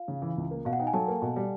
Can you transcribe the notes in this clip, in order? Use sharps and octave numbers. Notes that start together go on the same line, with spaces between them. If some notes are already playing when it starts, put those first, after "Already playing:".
Already playing: F4 F5
C#3
E3
C#2
A#3
B2 F5
F#5
D#4 G5
G#5
F#3 A4 A5
A#3
B2
G3